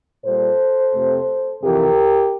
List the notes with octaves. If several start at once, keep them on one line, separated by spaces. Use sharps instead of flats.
A#2 G3 A#3 A4 C5
F2 C3 F3 A3
F2 C3 E3 G4 A#4